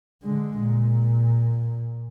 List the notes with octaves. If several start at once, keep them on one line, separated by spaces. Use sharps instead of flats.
D3 G#3
A#2